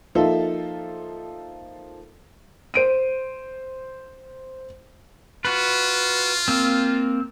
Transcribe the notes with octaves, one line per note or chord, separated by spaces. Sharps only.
F3 A#3 D#4 F4 A4 E5
C5 D7 D#7
F4 F#4 B4
A#3 C4